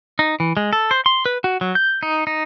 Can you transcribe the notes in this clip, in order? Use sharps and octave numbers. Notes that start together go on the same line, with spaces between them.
D#4
E3
G#3
A4
C5
C6
B4
F#4
F#3
G6
D#4
D#4